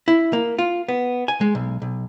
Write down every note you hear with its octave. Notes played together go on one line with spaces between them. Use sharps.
E4
A#3
F4
B3
G#5
G#3
B1
B1